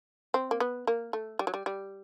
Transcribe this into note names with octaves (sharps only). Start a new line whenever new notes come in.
C4
A#3
B3
A#3
A3
G3
F#3
G3
G3